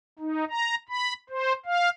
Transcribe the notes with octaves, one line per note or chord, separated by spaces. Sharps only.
D#4
A#5
B5
C5
F5